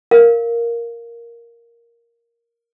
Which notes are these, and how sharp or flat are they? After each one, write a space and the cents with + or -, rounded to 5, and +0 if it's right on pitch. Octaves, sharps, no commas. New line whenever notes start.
A#4 +0 F5 +0